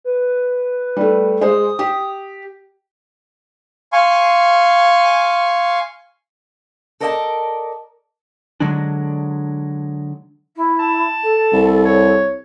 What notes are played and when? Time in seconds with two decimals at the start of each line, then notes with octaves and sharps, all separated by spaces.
0.04 B4
0.96 G3 A3
1.41 G#3 C5 D#6
1.79 G4
3.92 F5 G#5 C6 C#6
7.00 A4 A#4 D5 D#5 F#5 A5
8.60 D3 F#3 G#3 D4
10.56 E4
10.79 A5
11.23 A4
11.52 C2
11.85 C#5